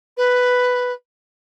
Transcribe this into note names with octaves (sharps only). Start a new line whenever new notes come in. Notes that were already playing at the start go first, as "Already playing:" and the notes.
B4